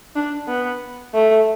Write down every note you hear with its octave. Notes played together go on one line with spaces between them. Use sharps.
D4
B3
A3